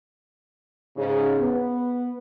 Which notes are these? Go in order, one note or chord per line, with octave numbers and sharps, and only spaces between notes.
G#2 C#3
B3